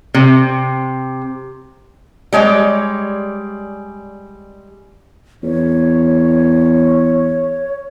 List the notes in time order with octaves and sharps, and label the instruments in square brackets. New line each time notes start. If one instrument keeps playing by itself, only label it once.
[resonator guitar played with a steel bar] C3
G3 G#3 C#5 D5
[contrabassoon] E2 [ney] C#5